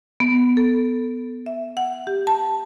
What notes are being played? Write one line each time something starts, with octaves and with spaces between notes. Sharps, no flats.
B3
A4
E5
F#5
G4
A5